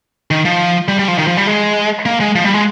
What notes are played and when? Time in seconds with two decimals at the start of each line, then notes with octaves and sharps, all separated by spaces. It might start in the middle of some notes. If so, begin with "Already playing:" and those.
0.31 D#3
0.45 F3
0.88 G3
0.99 G3
1.08 F3
1.18 D#3
1.27 F3
1.37 G3
1.47 G#3
2.06 A#3
2.20 G#3
2.35 F3
2.44 G3
2.54 G#3